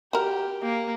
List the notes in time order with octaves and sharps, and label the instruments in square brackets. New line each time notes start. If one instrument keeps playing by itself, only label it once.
[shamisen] F#4 A#4 [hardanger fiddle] G4
[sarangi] A#3